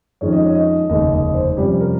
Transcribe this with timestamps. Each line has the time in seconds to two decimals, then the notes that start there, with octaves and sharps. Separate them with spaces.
0.21 F2 D#3 G#3 C#4 C#5
0.33 D#5
0.44 C#5
0.55 D#5
0.90 F1 D#2 C#3 G#3 D#5
1.12 D#5
1.34 C5
1.57 F2 C3 G3 C#4 G4
1.81 A#4